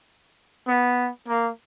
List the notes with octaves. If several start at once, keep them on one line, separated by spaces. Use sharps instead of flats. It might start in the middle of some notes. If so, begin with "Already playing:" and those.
B3
A#3